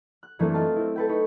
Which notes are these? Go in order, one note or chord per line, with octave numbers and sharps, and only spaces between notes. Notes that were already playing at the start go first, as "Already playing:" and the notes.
F#6
F#2 E3 A3 A#3 C4 D4
F4 D#5 A5 C7
C4 E4
A4 B4 G5
D#4 B4 C#5